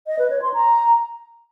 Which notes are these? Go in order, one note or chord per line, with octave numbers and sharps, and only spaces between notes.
D#5
B4
C#5
C6
A#5